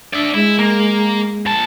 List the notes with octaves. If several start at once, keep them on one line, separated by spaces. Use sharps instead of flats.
D4 D5 E5
G#3 E4
A#3
A#2 A5